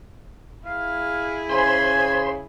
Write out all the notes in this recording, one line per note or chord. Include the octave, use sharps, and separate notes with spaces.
E4 G#4 F5
C#3 C5 G#5 B5 C6